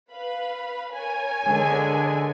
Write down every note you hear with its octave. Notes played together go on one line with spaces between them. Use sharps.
B4 F5 B5
A#4 C#5 G#5
D3 G#3